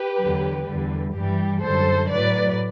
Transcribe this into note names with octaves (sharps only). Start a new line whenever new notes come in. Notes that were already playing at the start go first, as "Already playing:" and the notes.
Already playing: G4 B4
E2 D3 F#3
E2 D3 G3
G2 E3 G3 G4
F#2 D3 G3 A4 C5
A2 F#3 B4 D5